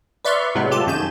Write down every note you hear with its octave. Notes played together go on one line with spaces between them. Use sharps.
B4 D5 E5 C6 C#6 F6
A2 C3 F#3 G#3 B3
F4 G4 A4 A5
F#2 D#3 G#5 G6 E7